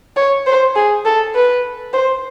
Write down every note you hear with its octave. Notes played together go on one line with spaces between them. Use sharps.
C#5
C5
G#4
A4
B4
C5